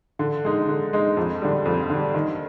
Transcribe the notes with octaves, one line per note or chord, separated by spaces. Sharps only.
D3
G#3 D#4
D3
G#3 D#4
F2
D3 G3
F2
D3 G3
D#3